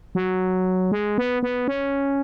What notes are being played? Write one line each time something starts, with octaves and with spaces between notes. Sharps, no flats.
F#3
G#3
B3
B3
C#4